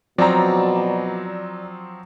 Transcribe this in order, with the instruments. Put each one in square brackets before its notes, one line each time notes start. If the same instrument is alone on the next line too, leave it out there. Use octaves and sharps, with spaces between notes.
[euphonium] B2 [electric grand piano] F3 F#3 C4 [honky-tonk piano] D5 A#5